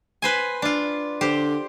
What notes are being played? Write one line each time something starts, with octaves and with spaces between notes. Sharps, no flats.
B4 C5 G#5
D4 F4
D3 G4 C5